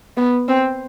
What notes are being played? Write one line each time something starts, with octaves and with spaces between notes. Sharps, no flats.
B3
C4